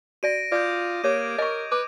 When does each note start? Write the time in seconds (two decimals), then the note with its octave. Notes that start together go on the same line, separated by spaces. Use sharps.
0.23 F#4 D5 A#6 D7 D#7
0.52 F4 D5 D6 D#6 G6
1.04 A#3 G4 C#5 D6 G#6 D#7
1.39 A#4 D#5 C#6
1.72 B4 D6